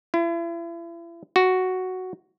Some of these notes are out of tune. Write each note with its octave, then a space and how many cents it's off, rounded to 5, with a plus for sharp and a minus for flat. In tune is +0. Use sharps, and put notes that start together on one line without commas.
E4 +40
F#4 +0